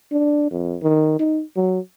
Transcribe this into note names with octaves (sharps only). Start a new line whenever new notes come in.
D4
F2
D#3
D#4
F#3